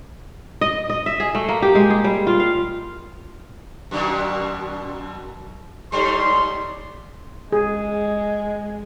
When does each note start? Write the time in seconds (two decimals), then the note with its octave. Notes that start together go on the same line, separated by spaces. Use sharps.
0.61 D#5
0.90 D#5
1.06 E5
1.20 G#4
1.35 A3
1.49 A#3
1.62 G4
1.75 G#3
1.90 G#4
2.04 G3
2.27 F4
2.40 F5
3.91 F#2 B2 D#3
5.92 G#2 G3 D#4 C#5 C6
7.53 G#3 G#4